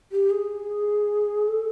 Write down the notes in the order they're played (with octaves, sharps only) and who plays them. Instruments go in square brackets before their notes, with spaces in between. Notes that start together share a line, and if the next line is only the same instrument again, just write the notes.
[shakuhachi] G4
G#4
A4